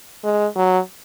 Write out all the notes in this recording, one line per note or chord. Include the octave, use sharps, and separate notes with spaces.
G#3
F#3